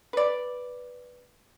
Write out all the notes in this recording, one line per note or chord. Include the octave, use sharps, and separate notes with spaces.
B4 D5